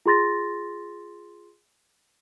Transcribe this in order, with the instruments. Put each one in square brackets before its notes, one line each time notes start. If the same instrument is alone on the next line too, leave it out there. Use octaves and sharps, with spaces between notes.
[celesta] F4 G#4 C6 A6 A#6